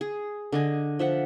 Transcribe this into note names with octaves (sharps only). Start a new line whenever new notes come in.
G#4
D3 D#5 G#5
F3 E5 F#5